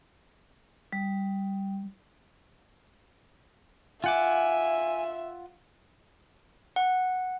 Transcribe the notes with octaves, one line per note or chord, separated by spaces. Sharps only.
G3
F4 E5 F#5 G#5 D6
F#5